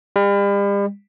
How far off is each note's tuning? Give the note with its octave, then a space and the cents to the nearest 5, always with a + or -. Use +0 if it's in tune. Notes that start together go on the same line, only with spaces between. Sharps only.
G3 +40